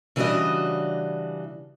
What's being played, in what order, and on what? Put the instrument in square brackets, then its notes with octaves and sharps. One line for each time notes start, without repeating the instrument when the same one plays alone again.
[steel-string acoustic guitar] C#3 E3 G3 D4 F#4 D#5